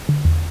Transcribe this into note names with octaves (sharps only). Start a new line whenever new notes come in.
D3
E2